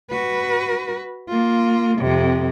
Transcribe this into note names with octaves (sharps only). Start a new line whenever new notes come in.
F#4 B4
A#3 F4
F2 C3